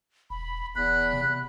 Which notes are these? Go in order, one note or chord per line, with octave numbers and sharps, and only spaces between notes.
E1 B5
D#1 E2 B5 F#6
C3